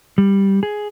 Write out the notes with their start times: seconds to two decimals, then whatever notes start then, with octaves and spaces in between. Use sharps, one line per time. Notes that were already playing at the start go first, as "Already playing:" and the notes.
0.18 G3
0.63 G#4